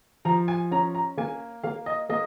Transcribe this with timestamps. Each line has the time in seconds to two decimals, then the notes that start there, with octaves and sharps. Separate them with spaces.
0.25 F3 A#5
0.48 G#5
0.71 C#4 A#5
0.95 A#5
1.17 A#3 G#5
1.63 A#3 F5
1.86 D#5
2.09 A#3 D#5